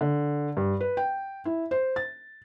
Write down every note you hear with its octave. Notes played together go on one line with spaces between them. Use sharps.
D3
G2
B4
G5
E4
C5
A6